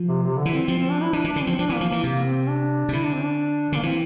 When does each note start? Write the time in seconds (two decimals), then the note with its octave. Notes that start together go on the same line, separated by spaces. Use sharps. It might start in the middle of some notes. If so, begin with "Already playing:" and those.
Already playing: F3
0.08 C3
0.23 C3
0.38 D3
0.45 E3
0.53 C4
0.68 F3 C4
0.79 C4
0.91 D4
1.02 E4
1.13 E3 D4
1.24 E3 D4
1.36 D3
1.43 F3 C4
1.58 F3 D4
1.69 E3 A#3
1.81 F3
1.89 E3 A#3
2.03 C3 A#3
2.26 C4
2.48 D4
2.89 C3
2.93 D3 E4
3.04 D4
3.13 C4
3.23 D4
3.72 D3 A#3
3.83 E3 C4